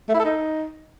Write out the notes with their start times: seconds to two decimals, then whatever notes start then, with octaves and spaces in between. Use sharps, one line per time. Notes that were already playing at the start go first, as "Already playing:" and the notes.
0.09 A3
0.14 E4
0.19 A4
0.25 D#4